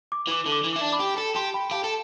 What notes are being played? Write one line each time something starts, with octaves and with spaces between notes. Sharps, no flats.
D6
E3 D6
D3
D6
E3
E4 D6
D4
B5 D6
G4
A4
G4 A5 C6
G5 B5
G4 F5 A5
A4